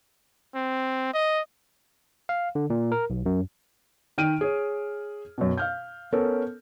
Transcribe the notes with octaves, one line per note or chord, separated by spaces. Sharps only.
C4
D#5
F5
D3
A#2
A#4
B1
F#2
D#3 G5 F6 D7 D#7
G#4 C#5
F#2 B2
F5 F6 G6
B3 C#4 A4 A#4